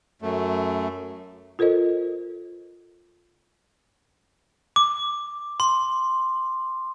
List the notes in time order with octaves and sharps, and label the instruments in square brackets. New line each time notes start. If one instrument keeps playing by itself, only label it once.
[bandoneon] F#2 A3
[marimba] F4 A4 A#4 C5 D#5
[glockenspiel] D6
C6